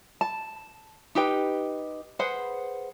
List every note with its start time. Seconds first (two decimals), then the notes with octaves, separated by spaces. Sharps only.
0.21 A5
1.15 D#4 G4 B4 G5
2.19 G#4 B4 C5 F#5